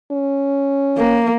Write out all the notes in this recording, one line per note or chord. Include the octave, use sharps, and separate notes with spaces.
C#4
A#3